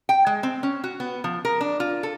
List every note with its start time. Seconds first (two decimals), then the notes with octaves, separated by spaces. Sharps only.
0.09 G5
0.27 G#3
0.43 C4
0.63 C#4
0.84 F#4
1.00 B3
1.24 F3
1.45 A#4
1.61 D4
1.80 F4
2.03 A4